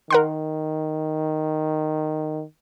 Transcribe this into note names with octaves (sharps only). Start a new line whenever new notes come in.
D#3 A#4 F#5 C6